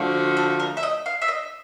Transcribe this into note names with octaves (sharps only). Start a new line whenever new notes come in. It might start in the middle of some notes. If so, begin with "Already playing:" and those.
Already playing: D3 F3 A3 D4 F#4
A4
A#4
E5
D#5
F5
E5
D#5